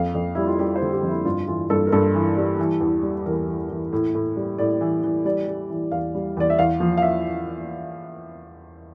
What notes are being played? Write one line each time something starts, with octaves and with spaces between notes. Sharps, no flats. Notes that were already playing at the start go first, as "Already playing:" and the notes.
Already playing: F2 F5
F2
G3 E4
F4
G3 G4
C5
D3
G4
F2
E4
G2 F4
E3 F4
G2 A4
A#4
G2 A4
E3
G3
E3
E2
G3
E2 A#4
E3
E3
A2
A2
G3
A2 D5
E3
E3
G3 D5
G3
E3
E2 F5
G3
E2 D5
E5
E2 F5
F3
F5
E5